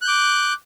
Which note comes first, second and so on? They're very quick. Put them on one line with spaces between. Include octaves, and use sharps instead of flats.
F#6 G6 D6